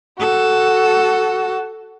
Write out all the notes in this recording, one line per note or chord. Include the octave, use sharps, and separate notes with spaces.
F#4 A4